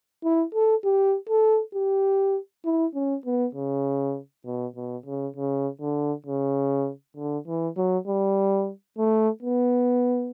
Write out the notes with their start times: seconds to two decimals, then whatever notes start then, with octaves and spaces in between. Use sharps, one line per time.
0.24 E4
0.54 A4
0.84 G4
1.29 A4
1.75 G4
2.65 E4
2.95 C#4
3.25 B3
3.55 C#3
4.46 B2
4.76 B2
5.06 C#3
5.36 C#3
5.81 D3
6.26 C#3
7.17 D3
7.47 E3
7.77 F#3
8.08 G3
8.98 A3
9.43 B3